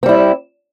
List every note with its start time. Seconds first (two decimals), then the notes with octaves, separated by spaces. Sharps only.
0.03 C4
0.06 G3
0.09 E4